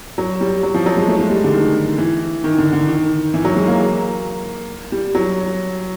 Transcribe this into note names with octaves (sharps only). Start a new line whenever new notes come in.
F#3
G3
F#3
F3
F#3
G#3
A3
G#3
G3
D3
D#3
E3
D#3
D3
D3
D#3
E3
F#3
G#3
A#3
G3
F#3